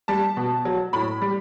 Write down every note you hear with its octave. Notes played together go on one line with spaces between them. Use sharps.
G3 A5
B2
F#3
A2 B5
G3